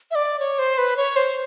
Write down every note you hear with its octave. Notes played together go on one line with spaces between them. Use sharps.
E5
D5
C#5
C5
B4
C#5
C5